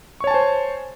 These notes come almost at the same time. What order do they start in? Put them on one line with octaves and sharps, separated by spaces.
C#6 C#5 A5 G#5 C5